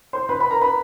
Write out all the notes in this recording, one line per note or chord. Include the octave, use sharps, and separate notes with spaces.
C5 C6
B4 B5
B4 B5
A#4 A#5
B4 B5